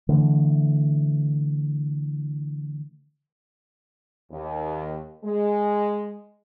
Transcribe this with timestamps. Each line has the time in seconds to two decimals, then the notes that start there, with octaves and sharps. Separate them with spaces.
0.09 D3 E3 A3
4.31 D#2
5.24 G#3